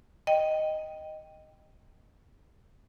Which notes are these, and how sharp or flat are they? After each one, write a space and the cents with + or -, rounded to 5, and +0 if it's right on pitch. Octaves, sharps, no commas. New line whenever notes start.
D#5 +0 G5 +0